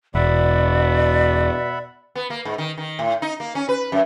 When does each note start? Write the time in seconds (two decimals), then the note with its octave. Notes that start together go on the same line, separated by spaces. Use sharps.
0.15 E1 B2 D5 E5 F#5 B5
2.15 B3
2.30 A#3
2.45 G#2
2.58 D#3
2.78 D#3
2.99 A2
3.22 D#4
3.40 A#3
3.55 C#4
3.69 B4
3.92 F#2